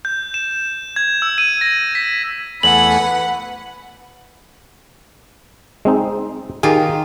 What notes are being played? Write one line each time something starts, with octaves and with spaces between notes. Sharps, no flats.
G6
E7
G#6
E6
D#7
A#6
B6
E2 A3 F#5 G#5 B5 F#7
B4
G#3 C4 D#4
D#3 F4 G4 G#4